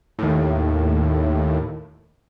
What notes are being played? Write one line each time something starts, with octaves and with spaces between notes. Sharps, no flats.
D#2 A2